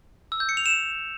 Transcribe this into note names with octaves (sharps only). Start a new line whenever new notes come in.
E6
G6
C#7
F7
E7